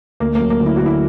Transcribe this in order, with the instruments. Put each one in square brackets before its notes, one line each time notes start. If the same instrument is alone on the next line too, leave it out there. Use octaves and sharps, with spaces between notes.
[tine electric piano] D2 [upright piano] A#3
[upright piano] A#3
[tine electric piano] F#3
[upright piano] A#3
[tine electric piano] D2
[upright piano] E4
[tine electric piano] D2 [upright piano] F#4
[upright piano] E4